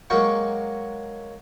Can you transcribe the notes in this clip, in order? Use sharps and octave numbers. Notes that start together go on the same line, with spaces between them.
F#3 G#3 A#3 F#4 G5 C#6